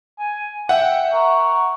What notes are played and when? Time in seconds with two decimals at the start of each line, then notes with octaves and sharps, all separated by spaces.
0.19 G#5
0.69 E5 F#5 G5
1.13 A#4 C#6